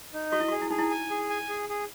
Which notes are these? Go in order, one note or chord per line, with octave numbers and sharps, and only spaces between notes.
D#4
F#4 D#5
E4
F#4 G#4
E4
D#4 G#4
E4
G#5
G#4
G#5
G#4
G#4